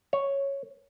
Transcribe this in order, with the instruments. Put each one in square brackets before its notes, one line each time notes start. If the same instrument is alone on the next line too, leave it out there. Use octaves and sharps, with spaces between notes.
[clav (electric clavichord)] C#5